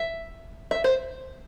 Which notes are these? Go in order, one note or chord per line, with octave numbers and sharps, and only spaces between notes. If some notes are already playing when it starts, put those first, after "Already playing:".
Already playing: E5
E5
C5